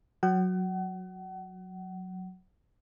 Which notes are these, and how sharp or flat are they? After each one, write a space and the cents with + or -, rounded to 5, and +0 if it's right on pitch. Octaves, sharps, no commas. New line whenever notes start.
F#3 -10 F#5 +35